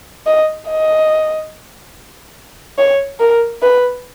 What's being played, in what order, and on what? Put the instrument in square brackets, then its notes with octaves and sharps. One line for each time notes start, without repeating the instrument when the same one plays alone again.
[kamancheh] D#5
D#5
C#5
A#4
B4